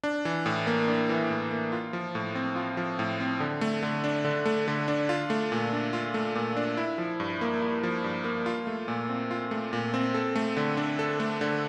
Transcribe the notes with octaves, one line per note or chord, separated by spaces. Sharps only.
D4
E3
A2
A#3
D4
E3
A2
A#3
F4
F3
A2
C4
F4
F3
A2
C4
D3
A3
D3
D4
D3
A3
D3
D4
F4
A3
A#2
D4
F4
A3
A#2
D4
E4
F3
G2
A#3
E4
F3
G2
A#3
F4
A3
A#2
C4
F4
A3
A#2
C4
A4
A3
D3
D4
A4
A3
D3